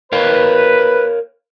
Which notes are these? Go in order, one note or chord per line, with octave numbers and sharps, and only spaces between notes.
A#4 B4 C#5 F5